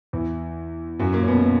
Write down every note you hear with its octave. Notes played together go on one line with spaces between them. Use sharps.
E2 E3
F#2 F#3
A#2 A#3
C#4
B2 B3
B2 B3